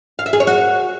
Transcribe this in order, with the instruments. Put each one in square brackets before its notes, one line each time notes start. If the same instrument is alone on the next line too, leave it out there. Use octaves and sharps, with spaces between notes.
[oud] F5
E5
G#4
C#5
F#4